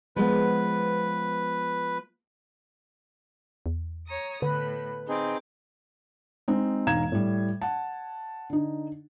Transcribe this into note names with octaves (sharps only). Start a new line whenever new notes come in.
F3 G#3 B3 B4
E2
C#5 A#5 D#6
A2 D3 B4 B5
C4 D#4 G#4 D6 G6
G#3 C4 D#4
E1 G#2 F5 A#5 G#6 E7
A2 G3
F#5 A5
D3 D#4